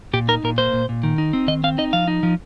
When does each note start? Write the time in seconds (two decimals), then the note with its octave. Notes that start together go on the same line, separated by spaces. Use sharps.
0.13 A#2 G4
0.28 D#4 A#4
0.44 A#2 A#4
0.58 A#3 C5
0.73 A#2
0.89 A#2
1.03 D#3
1.18 D#4
1.33 C4
1.48 D#3 D#5
1.64 C4 F5
1.78 D#4 D#5
1.93 F3 F5
2.08 D#4
2.23 F3